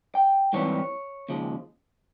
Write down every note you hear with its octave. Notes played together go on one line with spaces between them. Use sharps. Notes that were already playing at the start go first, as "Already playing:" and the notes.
G5
G#2 E3 G3 C4 C#5
D#2 C#3 F3 G#3